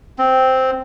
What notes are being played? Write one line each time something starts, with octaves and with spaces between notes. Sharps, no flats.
C4